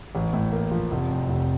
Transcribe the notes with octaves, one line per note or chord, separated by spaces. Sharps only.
A1
A2
A#3
F3
F1
F2
F1